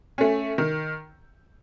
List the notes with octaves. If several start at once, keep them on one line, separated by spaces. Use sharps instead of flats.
A3 C#4
D#3